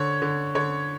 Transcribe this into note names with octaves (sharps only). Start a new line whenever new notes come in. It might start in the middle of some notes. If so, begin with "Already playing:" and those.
Already playing: D3 C#5
D3
D3 C#5